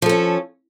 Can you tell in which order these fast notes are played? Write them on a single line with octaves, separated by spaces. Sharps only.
F3 A4 C#4